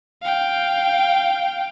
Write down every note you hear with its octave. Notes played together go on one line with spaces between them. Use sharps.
F5 G5